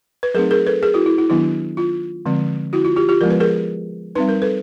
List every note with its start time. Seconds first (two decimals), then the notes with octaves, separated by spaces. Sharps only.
0.23 B4
0.34 F#3 A3 C4 D#4 G#4 A#4
0.51 G#4 A#4
0.67 A4 B4
0.83 G#4 A#4
0.94 E4 F#4
1.06 E4
1.18 E4
1.30 D#3 F#3 B3 D4 E4
1.77 F4
2.26 D3 F3 G#3 C4
2.73 E4 F#4
2.85 F4
2.97 F4 G4
3.09 F4 G4
3.21 F3 G#3 B3 A#4
3.30 B4
3.40 G#4 A#4
4.15 G3 C4 D#4 B4
4.29 A#4
4.42 A4 B4